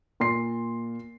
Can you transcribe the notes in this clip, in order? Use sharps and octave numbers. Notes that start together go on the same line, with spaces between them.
A#2 C6 C7